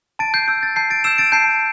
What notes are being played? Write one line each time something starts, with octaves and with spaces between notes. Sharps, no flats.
A5 A6 D7
G6 C7
E6 G6
A6
A5 G6 C7
A6 D7
E6 G6 C7 E7
A6 D7
A5 G6 C7